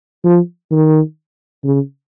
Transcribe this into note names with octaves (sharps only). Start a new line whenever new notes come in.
F3
D#3
C#3